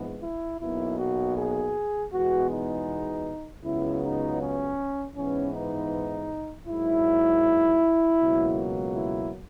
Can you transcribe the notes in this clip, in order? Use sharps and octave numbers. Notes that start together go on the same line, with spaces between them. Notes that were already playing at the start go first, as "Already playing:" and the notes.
Already playing: A#1 G#2 E3 G#3 B3
E4
B1 B2 A#3 E4
F#4
G#4
E2 B2 G#3 B3 F#4
D#4
C#2 C#3 F#3 B3 E4
D#4
C#4
G#2 E3 B3 C#4
D#4
G#2 F#3 A#3 E4
C#2 B2 F#3 A#3
E4